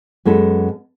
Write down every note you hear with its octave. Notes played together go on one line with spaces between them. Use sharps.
F#2 G#3 B3 A4